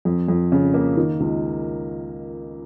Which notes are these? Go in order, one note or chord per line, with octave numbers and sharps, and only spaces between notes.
F2
F2
C#3
A#3
D#3
C#2